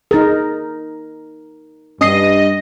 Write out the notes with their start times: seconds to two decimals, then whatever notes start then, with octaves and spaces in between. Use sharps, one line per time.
0.11 D#4 G#4 A#4 A6
2.01 G2 C#4 D#5 D#6 C7